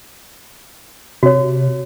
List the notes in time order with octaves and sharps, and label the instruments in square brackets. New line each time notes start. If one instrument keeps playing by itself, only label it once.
[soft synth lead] C3 [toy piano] F#4 C#5